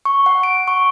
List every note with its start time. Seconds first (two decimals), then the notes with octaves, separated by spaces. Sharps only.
0.05 C#6
0.26 F#5
0.43 D7
0.68 C#6